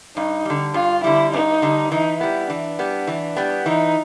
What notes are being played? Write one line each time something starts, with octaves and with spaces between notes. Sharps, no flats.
G2 D#4
D3 G3
G2 F4
D3 G3 E4
G2 D#4
D3 G3
E3 D#4
G3 B3 E4
E3 D4
G3 B3
E3
G3 B3
E3 D#4